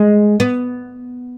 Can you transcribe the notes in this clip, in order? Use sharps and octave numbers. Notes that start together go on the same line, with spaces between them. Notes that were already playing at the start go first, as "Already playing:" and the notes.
Already playing: G#3
B3